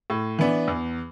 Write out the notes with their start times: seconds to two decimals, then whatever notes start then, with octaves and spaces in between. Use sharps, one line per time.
0.10 A2
0.39 E3 B3 D4
0.68 E2